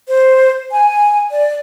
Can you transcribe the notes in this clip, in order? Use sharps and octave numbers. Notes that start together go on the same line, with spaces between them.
C5
G#5
D5